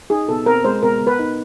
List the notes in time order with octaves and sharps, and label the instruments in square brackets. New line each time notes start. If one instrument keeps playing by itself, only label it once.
[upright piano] D#4 [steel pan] G#4
[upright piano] B2 [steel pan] A4
[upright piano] C4 [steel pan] A#4
[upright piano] G#3 [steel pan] C5
[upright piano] B2 [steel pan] A#4
[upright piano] B2
[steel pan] B4
[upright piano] D#4